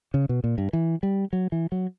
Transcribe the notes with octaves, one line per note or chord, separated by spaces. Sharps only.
C#3
B2
A#2
G2
E3
G3
F#3
E3
F#3